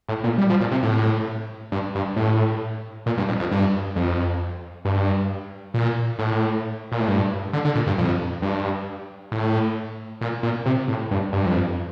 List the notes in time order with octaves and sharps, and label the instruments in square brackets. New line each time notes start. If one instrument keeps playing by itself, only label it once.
[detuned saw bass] A2
A#2
G3
F3
A#2
C3
A2
G2
G2
A2
A#2
G2
F2
F2
G2
F2
G2
A#2
A2
A#2
A2
G2
D3
D3
A#2
G2
F2
G2
A2
A#2
A#2
C3
A2
G2
G2
F2